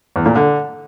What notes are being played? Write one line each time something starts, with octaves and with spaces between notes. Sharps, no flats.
E2
A#2
D3